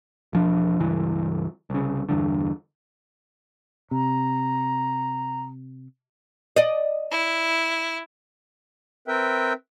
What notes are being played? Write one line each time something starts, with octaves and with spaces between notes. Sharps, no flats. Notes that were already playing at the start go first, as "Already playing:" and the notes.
E1 F3 D4
C#2 G2 E3
C2 C#3
E2 G2 D3
C3 A#5
D5 D#5
E4
C4 A#4 B4 E5 G5